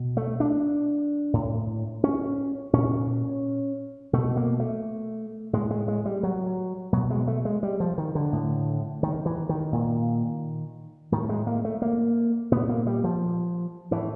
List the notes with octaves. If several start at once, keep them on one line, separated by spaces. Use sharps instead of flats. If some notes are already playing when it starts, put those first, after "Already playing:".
Already playing: B2
A3
D4
A2
C#4
A#2 C#4
B2 A3
A#3
A3
A2 G#3
G#3
G#3
G3
F#3
B2 F#3
G#3
A3
G#3
G3
F3
D#3
D3
A2
D#3
E3
D#3
A#2
A2 D#3
G#3
A#3
A3
A#3
A#2 B3
A#3
G3
F3
A2 E3